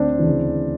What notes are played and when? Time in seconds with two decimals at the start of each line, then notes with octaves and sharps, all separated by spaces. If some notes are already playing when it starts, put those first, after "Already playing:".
Already playing: D2 C4 D4
0.19 C#3 E3